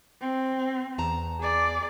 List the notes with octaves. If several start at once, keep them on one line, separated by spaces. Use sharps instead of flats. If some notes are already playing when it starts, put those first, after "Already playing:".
C4
E2 A5 A#5
G#4 D5